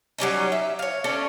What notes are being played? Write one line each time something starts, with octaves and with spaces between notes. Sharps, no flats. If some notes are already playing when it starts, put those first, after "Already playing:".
F#3 G3 C#4 D#4
E5
C#5 F5
C#4 D4 A4